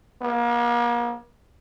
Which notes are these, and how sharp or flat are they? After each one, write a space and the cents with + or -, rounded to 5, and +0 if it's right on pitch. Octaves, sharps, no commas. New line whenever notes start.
A#3 +40